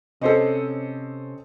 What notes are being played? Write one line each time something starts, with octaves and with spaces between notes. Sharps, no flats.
C3 C4 C#4 A4 C5 D#5